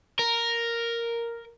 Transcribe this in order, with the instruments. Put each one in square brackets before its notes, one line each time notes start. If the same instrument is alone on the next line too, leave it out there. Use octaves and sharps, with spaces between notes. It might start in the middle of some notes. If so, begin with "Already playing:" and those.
[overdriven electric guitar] A#4